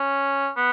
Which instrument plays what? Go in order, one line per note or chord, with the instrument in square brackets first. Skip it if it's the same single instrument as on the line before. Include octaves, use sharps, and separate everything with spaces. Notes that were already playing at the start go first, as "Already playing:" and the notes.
Already playing: [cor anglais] C#4
B3